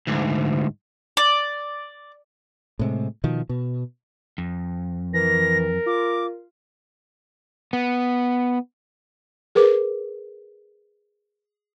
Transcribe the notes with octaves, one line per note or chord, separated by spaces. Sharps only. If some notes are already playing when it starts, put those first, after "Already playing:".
D2 G#2
D5
A2 C3 G#3
B2 D#3 F3
B2
F2
E3 A#4 A#6
F4 D6
B3
G#4 A#4 B4 D6